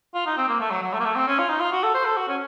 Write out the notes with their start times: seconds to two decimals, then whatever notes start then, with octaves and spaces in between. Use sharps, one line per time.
0.14 F4
0.26 D#4
0.37 C4
0.49 A#3
0.60 A3
0.71 F#3
0.83 F#3
0.93 A3
1.00 A#3
1.05 A3
1.16 C4
1.27 C#4
1.39 F4
1.49 D#4
1.60 F4
1.72 F#4
1.83 A4
1.95 C5
2.06 A4
2.17 F#4
2.28 C#4